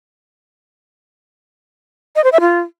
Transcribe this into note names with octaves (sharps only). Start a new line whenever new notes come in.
D#5
C5
E5
F4